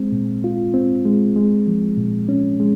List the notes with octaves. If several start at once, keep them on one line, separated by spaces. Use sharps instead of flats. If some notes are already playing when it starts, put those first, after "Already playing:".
Already playing: G#3 C4
A#2
F4
C4
G#3
G#3
F3
A#2
C#4
G#3